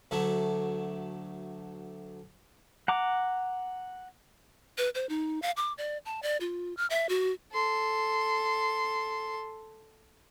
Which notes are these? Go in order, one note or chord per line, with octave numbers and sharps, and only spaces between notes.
D2 D3 F#3 A3
F#5 A#5 D6
B4
C5
D#4
F5
D6
D5
A5
D5
F4
F6
E5
F#4
A4 C6